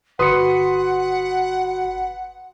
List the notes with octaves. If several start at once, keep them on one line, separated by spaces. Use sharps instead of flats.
G1 F#4 B4 F#5 C6 D#6 C#7